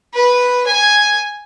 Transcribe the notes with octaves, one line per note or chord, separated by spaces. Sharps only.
B4
G#5